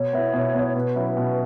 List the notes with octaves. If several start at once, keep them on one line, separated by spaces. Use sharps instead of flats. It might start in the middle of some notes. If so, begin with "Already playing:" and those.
Already playing: B2 C#5
B3 E4
B2
B3 E4
B2 B4
F#3 C#4 E4
B2